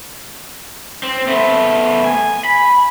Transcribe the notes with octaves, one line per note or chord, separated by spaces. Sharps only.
C4
A3 B3
G#5
B5